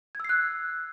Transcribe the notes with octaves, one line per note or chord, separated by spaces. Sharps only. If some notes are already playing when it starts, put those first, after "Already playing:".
E6 F#6 G#6 C7